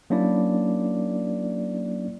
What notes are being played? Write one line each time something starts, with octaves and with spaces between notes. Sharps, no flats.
F#3 A#3 C#4 D4 E4 D5